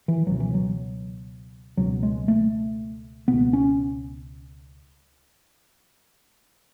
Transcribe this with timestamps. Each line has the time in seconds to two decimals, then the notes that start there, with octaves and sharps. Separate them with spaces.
0.08 E3
0.27 C#2 B2 F#3
0.40 E3
0.54 F#3
1.77 C#2 B2 F#3
2.03 G#3
2.28 A3
3.28 C#2 B2 B3
3.53 C#4